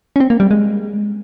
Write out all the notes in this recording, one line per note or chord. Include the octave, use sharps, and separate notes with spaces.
C#4
C4
A#3
G3
G#3